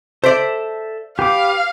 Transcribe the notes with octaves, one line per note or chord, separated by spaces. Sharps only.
A4 C5 D5 E5
G4 B4 F5 D6